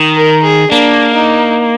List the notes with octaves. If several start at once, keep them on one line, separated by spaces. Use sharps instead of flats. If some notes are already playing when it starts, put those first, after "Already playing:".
Already playing: D#3
A#4
G#4
A#3 D4
D#4